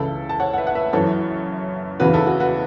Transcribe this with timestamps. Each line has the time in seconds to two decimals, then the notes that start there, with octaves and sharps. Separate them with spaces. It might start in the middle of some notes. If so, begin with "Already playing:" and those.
Already playing: C#2 C#3 E3 E4 A4
0.29 A5
0.40 C#5 F#5
0.53 F#5
0.58 B4 E5
0.67 F#5
0.75 B4 E5
0.93 F#2 E3 A4 C#5
2.00 E2 C#3 E3 F#4 B4
2.13 E4 A4
2.26 F#4 B4
2.40 F#4 B4